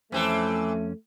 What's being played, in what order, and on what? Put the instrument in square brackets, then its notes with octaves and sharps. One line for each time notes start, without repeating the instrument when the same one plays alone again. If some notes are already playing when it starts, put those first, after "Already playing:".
[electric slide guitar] F2 C#4 [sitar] E3 C4 A4 [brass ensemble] A3